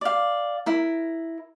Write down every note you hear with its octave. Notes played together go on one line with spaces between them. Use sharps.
D5 F5
E4 A#4